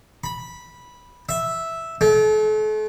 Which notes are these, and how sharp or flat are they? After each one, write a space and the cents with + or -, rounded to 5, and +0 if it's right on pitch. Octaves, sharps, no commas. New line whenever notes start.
B5 -10
E5 -5
A3 -40